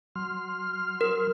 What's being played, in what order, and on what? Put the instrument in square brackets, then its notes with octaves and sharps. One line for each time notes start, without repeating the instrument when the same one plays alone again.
[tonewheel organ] F#3 C6 F6
[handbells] A#4